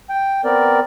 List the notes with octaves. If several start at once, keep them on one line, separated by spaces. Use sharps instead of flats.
G5
B3 C4 A#4 D5